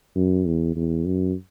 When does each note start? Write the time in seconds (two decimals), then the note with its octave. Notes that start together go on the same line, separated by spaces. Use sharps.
0.15 F#2
0.46 E2
0.76 E2
1.06 F#2